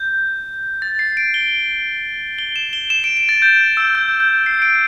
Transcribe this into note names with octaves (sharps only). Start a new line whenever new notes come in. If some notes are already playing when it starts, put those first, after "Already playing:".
Already playing: G6
A6
C7
D7
G7
G7
E7
G7
E7
D7
D7
A6
G6
E6
G6
G6
C7
D7